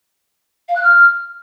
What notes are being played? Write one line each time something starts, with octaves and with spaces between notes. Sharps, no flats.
F5
F#6
F6